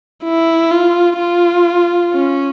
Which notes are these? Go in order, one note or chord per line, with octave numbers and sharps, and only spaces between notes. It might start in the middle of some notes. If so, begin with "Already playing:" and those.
E4
F4
F4
C#4